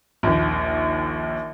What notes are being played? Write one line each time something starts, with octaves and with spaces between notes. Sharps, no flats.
A#1 D#2